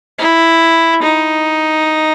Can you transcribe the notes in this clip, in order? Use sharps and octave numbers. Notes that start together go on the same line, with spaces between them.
E4
D#4